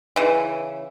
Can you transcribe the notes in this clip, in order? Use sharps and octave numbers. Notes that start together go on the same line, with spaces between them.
C#3 E3